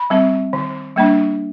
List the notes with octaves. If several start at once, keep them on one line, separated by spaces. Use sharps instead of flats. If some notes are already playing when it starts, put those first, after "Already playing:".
Already playing: B5
G3 C4
D#3
G3 A#3 D4